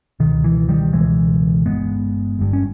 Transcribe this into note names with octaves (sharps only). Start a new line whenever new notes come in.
C#2 B2 D#3
E3
D#3 G3
C#2 B2 E3 G#3
G1 G2 G#3 B3
G1 G2
C#4